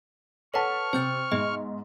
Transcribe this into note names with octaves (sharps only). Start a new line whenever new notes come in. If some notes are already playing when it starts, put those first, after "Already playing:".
A4 B4 C#5 F#5 A5 C#6 F6
C3 C5 G6 A6
G#2 B3 G#4 D#5